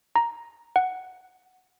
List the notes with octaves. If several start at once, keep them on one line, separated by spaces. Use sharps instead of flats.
A#5
F#5